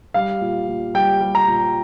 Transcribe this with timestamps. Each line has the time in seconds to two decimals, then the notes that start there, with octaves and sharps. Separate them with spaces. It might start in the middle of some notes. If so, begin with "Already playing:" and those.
0.14 G3 F5
0.41 A#2
0.68 A#2
0.94 G3 G5
1.20 G3
1.35 A#5
1.47 A#2